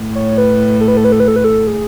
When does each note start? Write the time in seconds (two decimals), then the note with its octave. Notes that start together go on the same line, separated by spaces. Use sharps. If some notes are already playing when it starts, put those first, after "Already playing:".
Already playing: A2
0.15 C#5
0.38 B4
0.81 A4
0.88 B4
0.97 A4
1.04 B4
1.12 A4
1.20 B4
1.28 A4
1.36 B4
1.44 A4
1.67 G#4